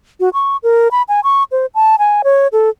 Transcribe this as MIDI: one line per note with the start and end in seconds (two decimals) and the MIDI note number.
0.20 0.29 66
0.34 0.57 85
0.63 0.88 70
0.91 1.02 83
1.09 1.20 80
1.24 1.44 85
1.52 1.66 72
1.75 1.96 81
1.99 2.22 80
2.24 2.48 73
2.52 2.70 69